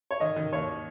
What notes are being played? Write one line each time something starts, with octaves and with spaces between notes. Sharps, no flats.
C#5
D#3 D#5
D#3
D#2 C#5